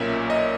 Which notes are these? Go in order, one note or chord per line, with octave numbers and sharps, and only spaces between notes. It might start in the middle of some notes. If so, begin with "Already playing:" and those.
Already playing: B1 A#2 A#3 C#4 E5
D#5